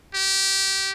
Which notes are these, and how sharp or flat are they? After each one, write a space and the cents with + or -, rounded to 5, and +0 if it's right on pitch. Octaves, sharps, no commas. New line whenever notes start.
G4 -20